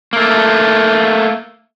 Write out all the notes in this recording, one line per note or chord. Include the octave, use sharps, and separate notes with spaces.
A3 A#3